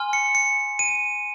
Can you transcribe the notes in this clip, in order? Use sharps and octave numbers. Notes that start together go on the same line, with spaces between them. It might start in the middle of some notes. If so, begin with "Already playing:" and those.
Already playing: G#5 C6 F6
C#7
C#7
D#7